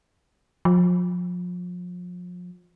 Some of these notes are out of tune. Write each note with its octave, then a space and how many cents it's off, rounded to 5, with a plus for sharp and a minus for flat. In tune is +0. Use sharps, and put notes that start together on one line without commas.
F3 +35